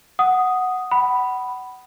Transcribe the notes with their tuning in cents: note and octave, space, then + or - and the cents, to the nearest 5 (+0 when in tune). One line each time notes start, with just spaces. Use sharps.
F#5 +0 D#6 +0
F#5 +25 B5 +0